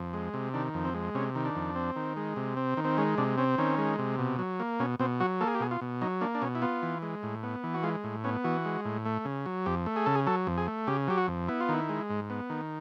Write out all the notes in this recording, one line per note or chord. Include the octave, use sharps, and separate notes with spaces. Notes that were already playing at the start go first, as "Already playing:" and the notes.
Already playing: F2
G#3
C3
D#3 D4
F2
C4
G#3
C3 C#4
D#3
D4
F2
C4
D#3
G#3
C3
C4
D#3
C4
G#3 C#4
C3 D4
C4 C#4
D#3 C#4
G#3
C3
B2
F#3
A#3
B2 C#4
B2 C4
F#3 F#4
A#3 A4
G#4
G4
B2 G#4
F4
B2
F#3 D#4
A#3 D4
D4
B2 C#4
E4
B3 F4
E3
G#3
A2
B3
E3
F#4
G#3 F4
A2
B3 C#4
E3 F#4
G#3
A2
A3
C#3
F#3
F2 G4
A3
G#4
C#3 A4
G#4
F#3 A4
F2
G#4
A3
C#3 G4
F#3 G4
F#4
F2
B3 E4
F4
D#3 E4
G#3
G#2
B3
D#3